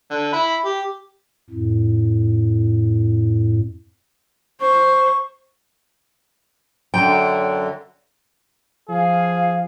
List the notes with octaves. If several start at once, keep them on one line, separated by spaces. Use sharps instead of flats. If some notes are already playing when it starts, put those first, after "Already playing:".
D3
E5 B5
G4
F2 A2
C5 C#6
F#2 D3 G5
F3 G#4 F5